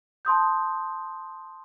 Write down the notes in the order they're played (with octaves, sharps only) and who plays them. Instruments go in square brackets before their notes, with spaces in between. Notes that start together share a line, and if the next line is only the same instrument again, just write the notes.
[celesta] A5 C6 D#6 G6